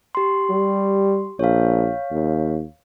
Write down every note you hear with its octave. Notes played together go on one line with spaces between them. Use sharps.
G4 C6
G3
A#1 C#5 F5
D#2